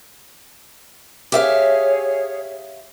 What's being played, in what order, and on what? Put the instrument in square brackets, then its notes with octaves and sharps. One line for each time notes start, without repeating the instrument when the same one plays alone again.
[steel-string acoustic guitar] G4 E5 F5 [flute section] G#4 C#5